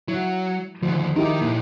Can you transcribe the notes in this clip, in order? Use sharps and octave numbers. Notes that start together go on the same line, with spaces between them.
F#3 E4
D2 D#3 F3
D#3 D#4 E4 G4 A#4
A#2 A#3 E4